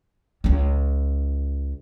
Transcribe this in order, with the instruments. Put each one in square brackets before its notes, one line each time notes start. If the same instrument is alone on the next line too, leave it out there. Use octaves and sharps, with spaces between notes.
[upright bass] C#2 C#4